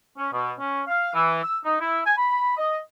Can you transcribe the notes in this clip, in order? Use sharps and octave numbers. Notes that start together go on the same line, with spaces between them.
C#4
B2
C#4
F5
E3
E6
D#4
E4
G#5
B5
D#5